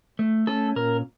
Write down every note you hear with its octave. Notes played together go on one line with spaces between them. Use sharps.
A3
C#4 A4
A#2 A#4